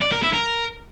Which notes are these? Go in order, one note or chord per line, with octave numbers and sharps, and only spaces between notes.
D5
A#4
E4
A#4